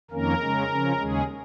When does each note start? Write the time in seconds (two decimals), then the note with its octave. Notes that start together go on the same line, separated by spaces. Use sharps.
0.11 F2 D#3 A#3 C#4 A#4
0.40 C#3 G#3 C#4
0.69 C#3 F3 C#4
0.98 D#2 C#3 G#3 C#4 G#4